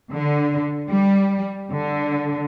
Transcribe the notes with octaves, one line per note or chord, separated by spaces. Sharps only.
D3
G3
D3